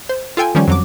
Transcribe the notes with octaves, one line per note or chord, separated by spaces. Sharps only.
C5
F4 A4 G5 G#5
D#3 F3 G3 C#4
F2 F#3 D6